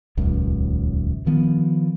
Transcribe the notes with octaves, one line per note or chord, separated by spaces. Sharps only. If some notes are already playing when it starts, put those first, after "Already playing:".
D#1 C#2 F#2
D#3 F3 B3